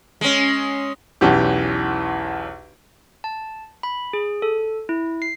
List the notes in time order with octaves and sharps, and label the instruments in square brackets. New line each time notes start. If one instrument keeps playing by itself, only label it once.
[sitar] G#3 C#4
[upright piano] B1 E2 E3 C#4 G4
[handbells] A5
B5
G#4
A4
E4
C7